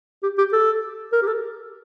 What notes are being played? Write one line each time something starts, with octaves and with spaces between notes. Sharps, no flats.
G4
G4
A4
A#4
G4
A4